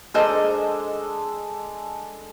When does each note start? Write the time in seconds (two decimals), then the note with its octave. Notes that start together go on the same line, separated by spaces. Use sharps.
0.14 G#3 D4 A4 A#4 C5 D#5